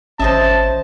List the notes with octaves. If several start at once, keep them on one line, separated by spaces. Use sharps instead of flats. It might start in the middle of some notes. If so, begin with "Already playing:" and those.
G#1 C#4 C5 D#5 E5 A5